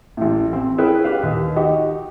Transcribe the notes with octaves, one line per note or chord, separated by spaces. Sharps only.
A1 A2
C4
E4 G#4 A#4 B4 C#5 G5
G4 B4 F5
D#2
D#4 F#4 G4 D#5